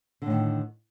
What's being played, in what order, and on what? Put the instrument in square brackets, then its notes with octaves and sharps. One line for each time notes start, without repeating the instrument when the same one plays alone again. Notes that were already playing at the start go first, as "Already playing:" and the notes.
[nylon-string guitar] D3
A2
D#3